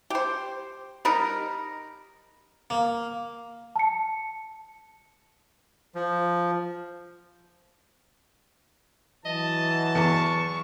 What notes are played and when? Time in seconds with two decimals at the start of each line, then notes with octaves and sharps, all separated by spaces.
0.10 G4 C5
1.05 G3 D#4 A#4
2.70 A#3
3.76 A5 C#7
5.95 F3
9.25 E3 F#3 D#5 A5
9.95 E2 C#6